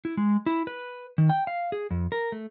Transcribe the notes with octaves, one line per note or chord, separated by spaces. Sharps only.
E4
G#3
E4
B4
D#3
G5
F5
G#4
F2
A#4
A3